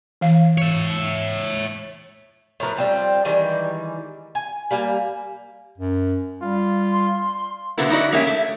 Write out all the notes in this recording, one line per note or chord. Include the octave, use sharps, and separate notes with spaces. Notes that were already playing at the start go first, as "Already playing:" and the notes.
E3 F5
C#5 E5
A2 F3 A#4 B4
G3 C4 F4
D#3 E3 G3 G#3
G#5
G3 A#3 G#5
F#2
G3 F4
C6
B2 D3 F#3 A#3 B3 E4
D#4 E4 F#4 D5 D#5
G#3 A#3 C#4 G4 E5
A3 E5